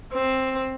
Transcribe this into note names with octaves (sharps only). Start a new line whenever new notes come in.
C4